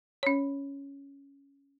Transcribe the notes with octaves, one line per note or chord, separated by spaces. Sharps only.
C#4 C#5